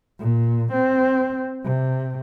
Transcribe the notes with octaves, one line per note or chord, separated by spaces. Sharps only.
A#2
C4
C3